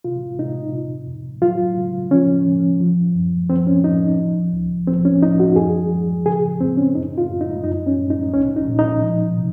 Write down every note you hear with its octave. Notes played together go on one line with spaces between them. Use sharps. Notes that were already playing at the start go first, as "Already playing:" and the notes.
C3 F4
C3 D#4
C3
F2
F#3 F4
C#3
F3 C#4
F3
F3
F#2
F3 C4
C#4
F3 D#4
F3
C#2
F3 C4
C#4
F3 D#4
F#4
F#2 G#4
F3
C#3 G#4
F2 C4
C#4
F#2 D#4
F4
F#2
D#4
F#2 D#4
C#4
F#2
D#4
C2 C#4
D#4
A#2
D#4
F3
C3